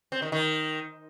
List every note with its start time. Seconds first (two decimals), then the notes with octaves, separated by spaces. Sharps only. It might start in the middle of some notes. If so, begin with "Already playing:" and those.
0.12 C4
0.22 D#3
0.32 D#3